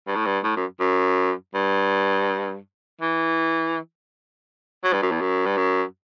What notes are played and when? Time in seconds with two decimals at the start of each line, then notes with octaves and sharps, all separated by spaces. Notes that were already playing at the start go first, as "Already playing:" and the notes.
0.08 G2
0.16 A2
0.26 G2
0.44 A2
0.56 F#2
0.80 F#2
1.54 G2
3.01 E3
4.84 F#3
4.93 G2
5.02 F#2
5.12 E2
5.21 F#2
5.46 G2
5.57 F#2